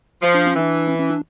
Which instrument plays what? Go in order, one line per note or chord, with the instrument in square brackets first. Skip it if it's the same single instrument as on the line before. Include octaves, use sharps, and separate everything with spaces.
[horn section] F3
[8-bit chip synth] D4
C#4
[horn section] E3 [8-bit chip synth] D4
[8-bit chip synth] C#4
C#4
D4